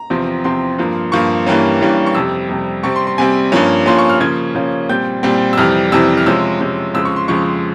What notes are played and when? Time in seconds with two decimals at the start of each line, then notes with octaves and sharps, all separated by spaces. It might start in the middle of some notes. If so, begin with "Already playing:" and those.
Already playing: A#5
0.10 E2 C3 F3 C4
0.44 E2 C3 F3 C4 C6
0.78 G2 F3 A#3
1.12 G2 F3 A#3 C#6
1.47 G2 E3 G3 A#3 C#4
1.81 G2 E3 G3 A#3 C#4
2.06 C#6
2.15 F2 C3 G3 E6
2.49 F2 C3 G3
2.83 C3 G3 C4 C#6
2.96 C6
3.07 C6
3.18 C3 G3 C4 G#5
3.52 G2 F3 A#3 C#4
3.86 G2 F3 A#3 C#4 C6
3.99 C#6
4.10 F6
4.20 C#3 F3 A#3 C#4 G#6
4.55 C#3 F3 A#3 C#4
4.89 A#2 G3 C4 G6
5.23 A#2 G3 C4
5.53 E6
5.57 F2 C3 E3 G3 F6
5.92 F2 C3 E3 G3 E6
6.17 F6
6.26 C3 F3 G#3 C#4 E6
6.61 C3 F3 G#3 C#4
6.94 F2 C#3 F3 G#3 E6
7.05 C#6
7.16 C6
7.28 F2 C#3 F3 G#3 C#6